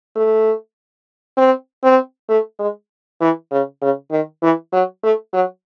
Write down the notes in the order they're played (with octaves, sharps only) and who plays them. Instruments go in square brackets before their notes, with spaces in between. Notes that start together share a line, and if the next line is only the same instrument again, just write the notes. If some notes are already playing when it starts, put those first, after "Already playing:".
[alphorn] A3
C4
C4
A3
G#3
E3
C#3
C#3
D#3
E3
F#3
A3
F#3